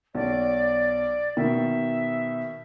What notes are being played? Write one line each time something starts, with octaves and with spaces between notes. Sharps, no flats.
B1 D5
B2 D#3 E5